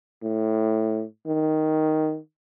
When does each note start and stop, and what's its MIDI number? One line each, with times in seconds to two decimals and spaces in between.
0.22 1.03 45
1.27 2.19 51